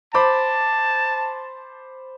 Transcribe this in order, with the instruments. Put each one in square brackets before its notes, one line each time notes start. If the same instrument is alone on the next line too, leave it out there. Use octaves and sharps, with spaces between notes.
[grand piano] C5 B5 D6 [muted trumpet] A5